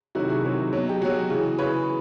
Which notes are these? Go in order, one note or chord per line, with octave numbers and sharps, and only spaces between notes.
C3 D#3 F#3 E4 F#4
F#4 G#4
C3 D#3 F#3
B2 F#3
G4
B2 F#3 F#4 G#4
C#3 E3
C#3 E3 B4 C#5